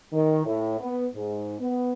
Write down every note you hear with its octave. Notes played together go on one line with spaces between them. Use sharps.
D#3
A2
B3
G#2
B3